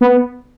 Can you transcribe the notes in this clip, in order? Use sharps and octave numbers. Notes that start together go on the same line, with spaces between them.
B3